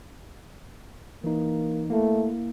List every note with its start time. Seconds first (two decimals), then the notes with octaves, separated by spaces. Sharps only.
1.24 E3 A#3 D#4
1.90 A3 A#3 E4